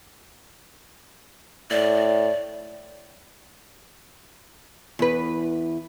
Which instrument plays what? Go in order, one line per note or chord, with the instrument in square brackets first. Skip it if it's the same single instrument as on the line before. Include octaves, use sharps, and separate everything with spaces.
[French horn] A2 [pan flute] D5
[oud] E2 B4